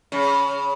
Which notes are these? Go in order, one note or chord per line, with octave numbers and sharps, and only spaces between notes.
C#3